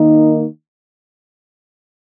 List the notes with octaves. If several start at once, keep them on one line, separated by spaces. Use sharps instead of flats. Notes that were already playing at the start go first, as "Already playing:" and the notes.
Already playing: D#3 A#3 D#4